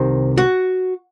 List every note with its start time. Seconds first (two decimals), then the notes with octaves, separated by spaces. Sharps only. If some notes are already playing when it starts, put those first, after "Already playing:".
Already playing: C2 C3 D#3 C5
0.37 F#4